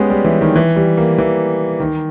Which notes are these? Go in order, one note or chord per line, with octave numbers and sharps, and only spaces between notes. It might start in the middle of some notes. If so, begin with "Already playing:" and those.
Already playing: G#3 B3 C#4 G4 G#4
G3
E3
D#3
E3
G3
A#3
E3
D#3